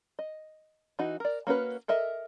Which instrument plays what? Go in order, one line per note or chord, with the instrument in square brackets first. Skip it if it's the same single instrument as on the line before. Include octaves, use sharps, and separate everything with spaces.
[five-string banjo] D#5
E3 D#4 F#4
A#4 D5
A#3 C#4 F#4 B4
A4 A#4 D#5 E5